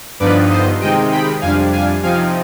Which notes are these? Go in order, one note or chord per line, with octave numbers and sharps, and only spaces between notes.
G2 D3 F3 B3 D#4 B4 D5
C5 D#5
C3 D#3 G#3 C4 D#4 D#5 G5
G5 B5
F2 C3 G3 D4 F5 G#5
F5 G#5
C3 F3 C4 D#4 F5 G#5